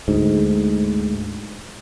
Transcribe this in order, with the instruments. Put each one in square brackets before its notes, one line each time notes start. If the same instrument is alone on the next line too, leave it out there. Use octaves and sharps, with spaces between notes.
[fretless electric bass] D2 G#2